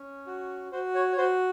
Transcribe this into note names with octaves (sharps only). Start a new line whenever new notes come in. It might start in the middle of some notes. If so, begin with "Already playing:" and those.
Already playing: C#4
F#4
F#4 C5
C#5
C#5
F#4 C5